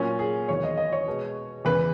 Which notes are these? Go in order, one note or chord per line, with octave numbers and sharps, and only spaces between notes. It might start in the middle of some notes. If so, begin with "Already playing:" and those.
Already playing: A#2 F#3 C#4
G#4
E2 D#3 F#3 C#5
D#5
D#5
C#5
B2 G#3
E2 C#3 E3 B4